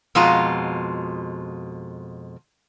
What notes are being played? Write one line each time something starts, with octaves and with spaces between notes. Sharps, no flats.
F2 B2 G#3 F4 A#5